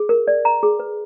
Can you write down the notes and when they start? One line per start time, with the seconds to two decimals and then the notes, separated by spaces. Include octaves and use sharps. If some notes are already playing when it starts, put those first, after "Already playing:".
Already playing: G#4
0.09 A#4
0.28 D5
0.45 A#5
0.63 G#4
0.79 B4